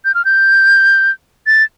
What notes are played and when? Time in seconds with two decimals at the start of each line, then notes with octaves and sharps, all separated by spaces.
0.05 G6
0.15 F6
0.25 G6
1.47 A6